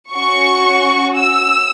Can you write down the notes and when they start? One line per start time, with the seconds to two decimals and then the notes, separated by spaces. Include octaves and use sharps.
0.13 C#4 F#4 C#6
1.17 E6